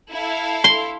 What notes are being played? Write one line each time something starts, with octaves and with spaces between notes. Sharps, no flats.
E4 A4 F5
C6